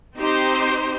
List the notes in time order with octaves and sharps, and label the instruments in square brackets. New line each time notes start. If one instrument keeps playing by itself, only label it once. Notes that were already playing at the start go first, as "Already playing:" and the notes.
[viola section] C4 D#4 G4 C5